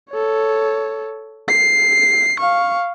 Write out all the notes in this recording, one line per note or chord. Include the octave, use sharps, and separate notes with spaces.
A4 C#5
C7
F5 C#6